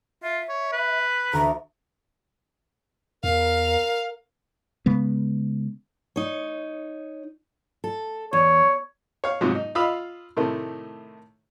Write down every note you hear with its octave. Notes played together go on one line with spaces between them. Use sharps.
F4 E5
C#5
B4
D2 A#5
E2 A#4 F5
C#3 G#3 B3
D#4 C#5
A4
E2 C#5
C#5 F5
G#2 C3 F3 F#3
D#4
F4 D#5 F5 B5 E6
A2 C3 D#3 A3